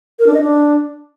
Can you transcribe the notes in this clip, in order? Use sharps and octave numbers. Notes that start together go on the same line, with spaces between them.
A#4
D4
D#5
D4